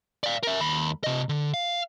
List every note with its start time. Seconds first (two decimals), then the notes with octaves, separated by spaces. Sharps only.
0.24 D5 F5
0.43 A#4 E5
0.60 D#2 B5
1.04 C3 D#5
1.29 D3
1.54 F5